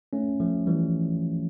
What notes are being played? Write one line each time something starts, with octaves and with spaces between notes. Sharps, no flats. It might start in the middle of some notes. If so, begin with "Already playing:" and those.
A3 C#4
F3 A3
E3 G3